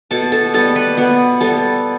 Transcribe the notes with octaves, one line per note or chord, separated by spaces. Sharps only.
B2 A4 A5
A4 A5
G3 B3 A4 A5
B3 B4
B2 B3 B4
G3 B3 A4 A5